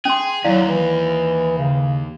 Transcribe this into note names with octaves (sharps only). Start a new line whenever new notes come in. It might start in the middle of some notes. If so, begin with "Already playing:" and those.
C#4 G#4 C6
D#2 F#3 E4 D5 F5
E3
C#3